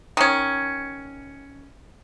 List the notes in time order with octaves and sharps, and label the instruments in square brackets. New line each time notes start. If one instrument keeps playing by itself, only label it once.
[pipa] D#3 C#4